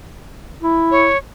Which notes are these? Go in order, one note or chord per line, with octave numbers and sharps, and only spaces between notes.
E4
C#5